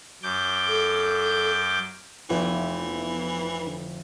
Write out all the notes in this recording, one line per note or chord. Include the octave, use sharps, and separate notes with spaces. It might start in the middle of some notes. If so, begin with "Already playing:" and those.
F#2 D6 G6
A4
F1 E3 F3 B3 E4
D3